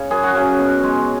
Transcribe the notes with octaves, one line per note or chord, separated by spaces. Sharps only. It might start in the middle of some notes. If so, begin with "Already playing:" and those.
Already playing: C#3 C#5
F#2 G#4
F#4
C#3 F#3 C#4
B2
G#3